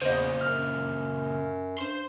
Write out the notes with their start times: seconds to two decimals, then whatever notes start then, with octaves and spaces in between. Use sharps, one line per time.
0.02 E2 A#2 C#3 C5 D#5
0.41 F#2 F6
1.79 G2 C5 C6